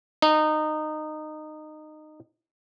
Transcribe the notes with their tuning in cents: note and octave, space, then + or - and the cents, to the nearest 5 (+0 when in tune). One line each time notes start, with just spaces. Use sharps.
D#4 -20